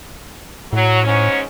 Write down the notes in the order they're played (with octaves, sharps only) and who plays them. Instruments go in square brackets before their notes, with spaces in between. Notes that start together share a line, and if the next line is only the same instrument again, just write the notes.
[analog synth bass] A2 [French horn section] F#3
[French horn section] G#2 C#4